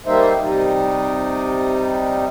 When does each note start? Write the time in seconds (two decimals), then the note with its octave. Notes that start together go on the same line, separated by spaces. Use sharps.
0.06 G3 A#3 D#4 C5 E5
0.42 C3 G3 D#4